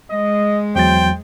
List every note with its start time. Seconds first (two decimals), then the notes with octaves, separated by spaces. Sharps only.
0.11 G#3 D#5
0.76 E2 F#3 C5 G5 A6